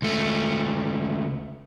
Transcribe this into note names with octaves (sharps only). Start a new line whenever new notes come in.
C#2 A3